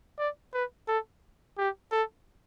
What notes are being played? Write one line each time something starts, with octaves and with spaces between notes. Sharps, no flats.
D5
B4
A4
G4
A4